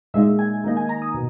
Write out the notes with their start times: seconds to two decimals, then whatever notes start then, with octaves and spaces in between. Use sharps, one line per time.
0.14 A#2 G#3 D#4 E5
0.39 G#5
0.64 D#3 A#3 D#4
0.77 G#5
0.89 A#5
1.02 D#6
1.14 B2